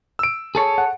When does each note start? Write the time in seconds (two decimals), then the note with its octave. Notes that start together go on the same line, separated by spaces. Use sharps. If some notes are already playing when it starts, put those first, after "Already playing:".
0.19 E6 D7
0.55 G#4 A4 C#5
0.78 F#5